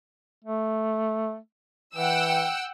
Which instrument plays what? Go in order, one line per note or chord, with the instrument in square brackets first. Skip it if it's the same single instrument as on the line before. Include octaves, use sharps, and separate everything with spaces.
[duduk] A3
[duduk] E3 [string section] F#5 G5 E6